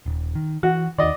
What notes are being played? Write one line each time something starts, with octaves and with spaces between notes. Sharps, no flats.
D#1
D#3
E3 F#4
D#2 D#3 D5 D#5